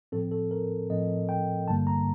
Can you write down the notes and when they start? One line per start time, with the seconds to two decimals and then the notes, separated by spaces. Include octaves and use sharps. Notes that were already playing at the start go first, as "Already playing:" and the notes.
0.12 A2 F3 C4 A4
0.32 A4
0.51 A#4
0.90 A2 F3 C4 D#5
1.29 G5
1.68 G1 G2 D3 G3 A#3 A5
1.87 A#5